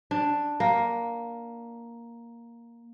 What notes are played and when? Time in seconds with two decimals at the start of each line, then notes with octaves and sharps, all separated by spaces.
0.11 D4
0.60 A#3